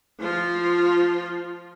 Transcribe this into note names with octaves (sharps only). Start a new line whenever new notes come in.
F3 F4